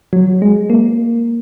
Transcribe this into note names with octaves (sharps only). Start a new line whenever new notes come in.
F#3
G#3
A#3